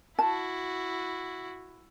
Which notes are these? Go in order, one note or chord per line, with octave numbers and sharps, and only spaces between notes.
E4 F#4 A5